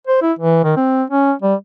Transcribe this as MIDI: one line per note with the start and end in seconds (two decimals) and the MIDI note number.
0.07 0.20 72
0.22 0.32 64
0.39 0.60 52
0.64 0.74 51
0.77 1.03 60
1.10 1.32 61
1.42 1.54 55